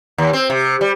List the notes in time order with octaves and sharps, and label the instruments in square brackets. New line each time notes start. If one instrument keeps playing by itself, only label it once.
[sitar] D#2
C4
C3
G3